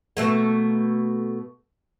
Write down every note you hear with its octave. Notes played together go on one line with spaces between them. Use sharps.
B2 A3 A#3